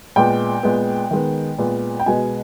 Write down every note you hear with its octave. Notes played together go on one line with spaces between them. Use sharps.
A#2 G#3 B3 G5
A#2 G#3 B3
D#3 G#3 B3
A#2 G#3 B3
G5
B2 G#3 B3 G#5